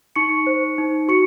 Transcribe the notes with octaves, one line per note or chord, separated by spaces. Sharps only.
D#4 C#6 C#7
C5
D#4
F#4 C#6 C#7